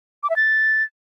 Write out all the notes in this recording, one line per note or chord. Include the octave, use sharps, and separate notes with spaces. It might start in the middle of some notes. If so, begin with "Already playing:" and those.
D6
E5
A6